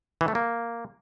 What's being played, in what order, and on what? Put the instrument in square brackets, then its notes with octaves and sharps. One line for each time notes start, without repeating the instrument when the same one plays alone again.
[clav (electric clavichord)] E3
A3
A#3